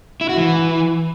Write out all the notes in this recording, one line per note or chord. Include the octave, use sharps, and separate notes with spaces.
E4
F#4
E3